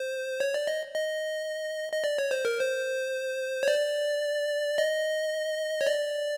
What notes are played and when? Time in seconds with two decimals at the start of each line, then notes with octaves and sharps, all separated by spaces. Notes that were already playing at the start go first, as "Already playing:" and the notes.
Already playing: C5
0.40 C#5
0.54 D5
0.67 D#5
0.95 D#5
1.92 D#5
2.04 D5
2.18 C#5
2.31 C5
2.45 A#4
2.59 C5
3.63 C#5
3.68 D5
4.78 D#5
5.81 C#5
5.87 D5